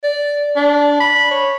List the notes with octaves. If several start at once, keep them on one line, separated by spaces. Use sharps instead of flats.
D5
D4
B5
C#5